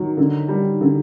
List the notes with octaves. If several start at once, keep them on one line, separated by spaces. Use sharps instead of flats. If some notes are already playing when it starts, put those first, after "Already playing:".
Already playing: D#3 F#3
D3
G3
D3